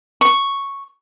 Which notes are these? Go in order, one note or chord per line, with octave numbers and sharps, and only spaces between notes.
C#6